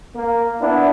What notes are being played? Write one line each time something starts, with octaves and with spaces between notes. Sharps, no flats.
A#3
B3 D4 E4